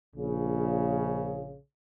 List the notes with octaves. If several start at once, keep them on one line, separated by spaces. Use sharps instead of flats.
A#1 C#3